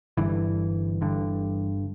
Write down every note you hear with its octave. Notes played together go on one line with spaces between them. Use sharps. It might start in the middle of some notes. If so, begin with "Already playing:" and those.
G1 G2 D3 E3
G1 G2 D3